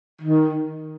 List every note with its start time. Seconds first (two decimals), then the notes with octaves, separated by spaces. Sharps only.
0.22 D#3